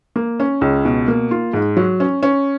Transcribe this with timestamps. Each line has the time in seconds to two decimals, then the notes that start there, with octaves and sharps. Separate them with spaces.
0.16 A#3
0.40 C#4
0.61 C#2
0.85 B2
1.08 A#3
1.31 F4
1.53 G#2
1.77 F#3
2.00 C#4
2.23 C#4